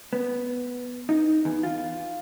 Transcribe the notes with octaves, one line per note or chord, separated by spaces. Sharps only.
B3
D#4
E2
F4